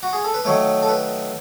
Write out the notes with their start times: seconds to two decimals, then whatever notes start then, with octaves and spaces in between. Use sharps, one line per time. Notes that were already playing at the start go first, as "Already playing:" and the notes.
0.03 F#4
0.13 G#4
0.24 A4
0.34 B4
0.45 D#3 F#3 A3 C#5
0.83 A4
0.88 B4